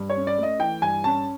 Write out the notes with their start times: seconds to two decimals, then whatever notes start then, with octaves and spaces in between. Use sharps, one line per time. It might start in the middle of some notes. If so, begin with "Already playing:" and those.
Already playing: G2
0.10 C#5
0.16 C#4
0.27 D5
0.38 A3 D#5
0.59 E3 G5
0.82 G2 G#5
1.04 C#4 A5